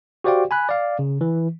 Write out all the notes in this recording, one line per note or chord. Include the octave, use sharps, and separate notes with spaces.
F#4 G4 C5 D5 F5 G5
G#5 B5 F#6
D5 F5
C#3
E3